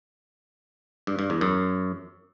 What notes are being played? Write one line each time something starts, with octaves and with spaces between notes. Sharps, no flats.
G2
G2
E2
F#2